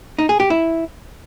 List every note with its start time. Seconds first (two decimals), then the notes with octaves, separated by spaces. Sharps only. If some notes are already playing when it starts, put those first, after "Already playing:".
0.19 D#4
0.29 G#4
0.40 G4
0.50 E4